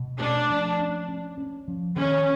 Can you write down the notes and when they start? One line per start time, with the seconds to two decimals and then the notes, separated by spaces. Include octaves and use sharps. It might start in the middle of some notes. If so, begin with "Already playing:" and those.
Already playing: B2
0.21 A3 D4
0.50 F3
0.80 C#4
1.09 C#4
1.38 C#4
1.68 F3
1.96 D#3 C#4